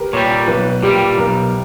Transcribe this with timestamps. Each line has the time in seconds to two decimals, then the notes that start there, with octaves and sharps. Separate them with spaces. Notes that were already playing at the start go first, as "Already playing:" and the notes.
Already playing: G4 A#4 B4
0.13 A#2 G3 C#5
0.48 B1 B4
0.83 A#2 G3 G4
1.18 B1 A#4